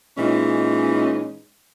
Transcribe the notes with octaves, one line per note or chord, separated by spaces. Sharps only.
A#2 E3 G#3 C#4 D#4